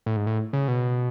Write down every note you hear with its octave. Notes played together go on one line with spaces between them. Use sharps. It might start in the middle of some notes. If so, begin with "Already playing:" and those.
A2
G#2
A2
C#3
B2